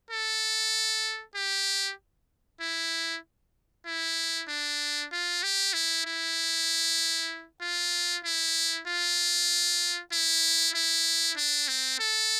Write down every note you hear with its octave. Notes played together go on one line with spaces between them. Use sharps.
A4
G4
E4
E4
D4
F4
G4
E4
E4
F4
E4
F4
E4
E4
D4
C4
A4